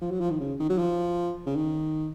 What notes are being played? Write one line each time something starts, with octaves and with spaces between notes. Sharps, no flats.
F3
F#3
F3
D#3
C#3
D#3
F#3
F3
C#3
D#3